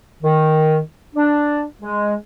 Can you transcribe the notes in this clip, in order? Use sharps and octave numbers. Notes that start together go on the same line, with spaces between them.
D#3
D4
G#3